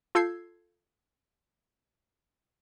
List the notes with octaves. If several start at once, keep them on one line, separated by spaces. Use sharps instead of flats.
F4 A4 E6 G6 G#6 C7